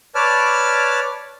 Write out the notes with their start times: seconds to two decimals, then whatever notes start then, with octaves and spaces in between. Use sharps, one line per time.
0.15 B4 C#5 D5 A5 D6 F6